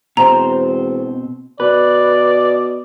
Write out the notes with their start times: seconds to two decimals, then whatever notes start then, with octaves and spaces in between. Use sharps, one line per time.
0.17 E1 B2 C4 C5 A#5
1.60 B2 B4 D5